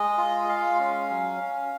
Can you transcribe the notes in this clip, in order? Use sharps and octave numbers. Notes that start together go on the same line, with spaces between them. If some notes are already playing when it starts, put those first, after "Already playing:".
Already playing: G#3 D#5
F4
G#3 F5
C#4
F#3
C#4